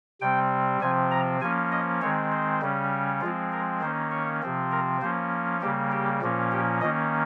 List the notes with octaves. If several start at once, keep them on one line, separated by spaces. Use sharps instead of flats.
C3 G3 C4 G5
C3 F3 C4 G#5
A#5
F3 A#3 C#4 G#5
D#5
D#3 G#3 C4 C#5
C5
C#3 G3 C#4
F3 G#3 C4 F4
A#4
D#3 A#3 C#4 C5
C#5
C3 F3 C4
A#4
F3 A#3 C#4 C5
C#3 G3 A#3 G4
G4
A#2 F3 A#3 C#4
G4
D#3 A#3 C#4 D#5